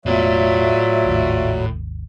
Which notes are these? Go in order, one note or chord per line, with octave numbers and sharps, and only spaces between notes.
E1 A2 F#3 B3 F4 D5 E5
G#1 D#2